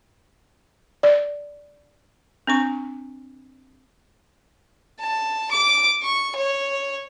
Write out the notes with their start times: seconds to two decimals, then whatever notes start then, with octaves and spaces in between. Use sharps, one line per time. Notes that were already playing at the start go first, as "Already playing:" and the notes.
1.03 D5
2.47 C4 D4 C#6
5.00 A5
5.51 D6
6.03 C#6
6.36 C#5